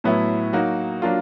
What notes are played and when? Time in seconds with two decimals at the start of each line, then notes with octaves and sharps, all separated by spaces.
0.04 A2 F#3 B3 E4
0.53 F#3 A#3 D#4 F#4
1.02 F#3 A#3 D4 F4